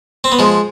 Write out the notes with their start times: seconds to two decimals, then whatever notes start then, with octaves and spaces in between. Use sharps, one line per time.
0.24 C4
0.32 B3
0.39 F3 G#3